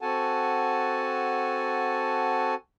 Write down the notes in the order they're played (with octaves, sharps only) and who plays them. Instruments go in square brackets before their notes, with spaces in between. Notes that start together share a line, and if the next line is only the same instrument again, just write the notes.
[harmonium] C4 F#4 A4 F#5 G#5 A5